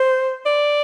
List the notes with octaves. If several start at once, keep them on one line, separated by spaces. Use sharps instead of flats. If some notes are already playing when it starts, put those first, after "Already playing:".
Already playing: C5
D5